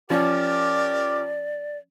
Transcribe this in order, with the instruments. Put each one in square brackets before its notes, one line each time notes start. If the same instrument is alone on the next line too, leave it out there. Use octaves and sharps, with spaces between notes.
[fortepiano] F3 C#4 [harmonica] G4 A#4 D6 [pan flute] D5